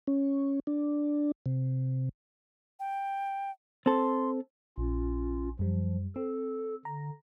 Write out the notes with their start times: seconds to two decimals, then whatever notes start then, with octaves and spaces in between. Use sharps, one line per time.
0.07 C#4
0.67 D4
1.46 C3
2.80 G5
3.86 C4 A4 C6
4.78 A#1 C#4 F4
5.59 F#2 F3 G3
6.16 C4 A4
6.85 D3 A#5